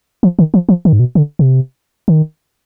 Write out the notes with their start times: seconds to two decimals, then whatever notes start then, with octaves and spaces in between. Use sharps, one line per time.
0.23 F3
0.39 D#3
0.54 F3
0.69 F3
0.85 D#3
0.93 G#2
1.00 B2
1.15 D3
1.39 C3
2.08 D#3